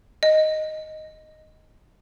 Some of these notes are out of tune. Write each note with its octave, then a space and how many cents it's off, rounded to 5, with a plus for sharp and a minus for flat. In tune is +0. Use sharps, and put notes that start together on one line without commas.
D#5 +0